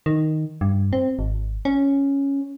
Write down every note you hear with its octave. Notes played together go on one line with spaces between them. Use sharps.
D#3
G2
C4
G#1
C#4